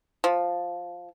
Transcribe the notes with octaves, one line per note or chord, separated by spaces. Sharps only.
F3